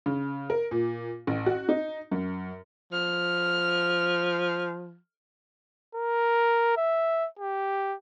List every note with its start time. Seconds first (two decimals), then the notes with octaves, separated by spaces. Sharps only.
0.06 C#3
0.50 A#4
0.71 A#2
1.27 A1
1.46 F#4
1.69 D#4
2.11 F#2
2.92 F3 F6
5.95 A#4
6.77 E5
7.39 G4